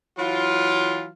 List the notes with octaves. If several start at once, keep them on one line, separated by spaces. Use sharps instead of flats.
E3 F#3 F4